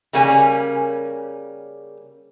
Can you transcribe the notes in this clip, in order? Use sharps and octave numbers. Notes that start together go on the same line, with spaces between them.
C#3 G3 A#3 C#4 G#5